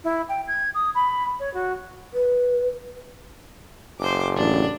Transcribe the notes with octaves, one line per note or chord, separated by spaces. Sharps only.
E4
G5
G#6
D#6
B5
C#5
F#4
B4
F#1 C5 D6
A1 D4